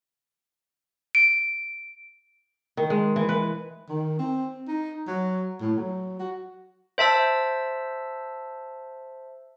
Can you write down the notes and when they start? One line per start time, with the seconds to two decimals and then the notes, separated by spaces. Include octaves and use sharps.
1.15 D7
2.77 D#3
2.90 G#3
3.16 E3
3.29 B4
3.89 D#3
4.19 C4
4.68 D#4
5.07 F#3
5.61 A2
5.77 F#3
6.19 F#4
6.98 C5 E5 A5 E6